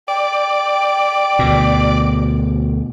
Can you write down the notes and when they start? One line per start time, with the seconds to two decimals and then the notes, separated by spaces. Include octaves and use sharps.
0.08 D5 G5
1.39 D2 B2